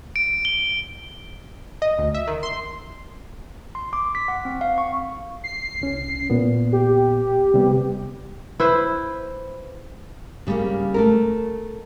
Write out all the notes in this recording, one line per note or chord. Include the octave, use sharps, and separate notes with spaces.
D7
G7
D#5
D2
E5
D#3
C6
C6
D6
B6
F#5
C4
F5
C#6
C7
C2 C#4
A#2 B3
G4
C3 G3 B3
E4 B4 C5
C#3 G3 G#3 A#3 C#4
A3 A4 A#4